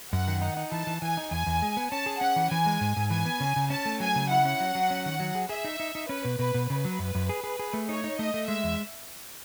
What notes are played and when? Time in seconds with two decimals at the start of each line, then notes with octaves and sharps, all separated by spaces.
0.13 F#2 F#5
0.28 D#3
0.42 D#4 F#5
0.57 D#4
0.72 E3 A5
0.87 E3
1.02 E3 G#5
1.17 D#4
1.31 E2 G#5
1.46 E2
1.62 G#3
1.77 B3
1.92 C#4 A5
2.06 G#4
2.21 C#4 F#5
2.36 E3
2.51 E3 G#5
2.66 G#3
2.81 G#2
2.96 G#2
3.10 E3 G#5
3.25 B3
3.40 C#3
3.56 C#3
3.70 C#4 A5
3.86 A3
4.00 F#3 G#5
4.16 C#3
4.31 E4 F#5
4.45 C#4
4.60 F#3
4.75 F#3
4.90 C#4
5.06 D#3
5.20 F#3
5.35 G#4
5.49 G#4 E5
5.65 D#4
5.80 D#4
5.95 D#4
6.09 C#4 B4
6.25 B2
6.39 B2 B4
6.54 B2
6.70 C#3 B4
6.85 F#3
6.99 F#2
7.15 F#2
7.29 G#4
7.44 G#4
7.59 G#4
7.73 A3
7.89 D#4 C#5
8.04 D#4
8.19 A3 D#5
8.34 A3
8.48 G#3 E5
8.64 E2